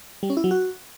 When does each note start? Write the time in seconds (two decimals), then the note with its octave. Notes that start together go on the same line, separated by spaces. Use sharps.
0.23 G3
0.30 C#4
0.37 E4
0.44 F#3
0.51 F#4